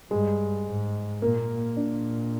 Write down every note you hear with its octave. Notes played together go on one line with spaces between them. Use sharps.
G2 G#3
G#2
A#2 A#3
A#2 D4